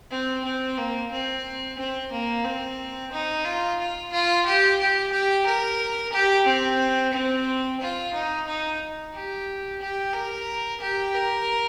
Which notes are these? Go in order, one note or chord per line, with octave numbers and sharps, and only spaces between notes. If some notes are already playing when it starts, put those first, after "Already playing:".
C4
C4
A#3
C4
C4
A#3
C4
D#4
F4
F4
F4
G4
G4
G4
A#4
G4
C4
C4
F4
D#4
D#4
G4
G4
A#4
G4
A#4